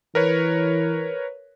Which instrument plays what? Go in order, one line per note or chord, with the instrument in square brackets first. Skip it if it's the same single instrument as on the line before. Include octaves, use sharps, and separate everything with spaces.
[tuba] E3 [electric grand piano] A#4 B4 C#5